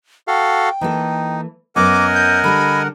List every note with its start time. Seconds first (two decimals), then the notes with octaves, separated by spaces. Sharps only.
0.28 F#4 A4 F5 G5
0.81 E3 A#3 D#4 A4
1.76 F#2 B3 A#4 D#5 F#5 G#5 D6
2.14 G6
2.44 D3 G3 D4 B5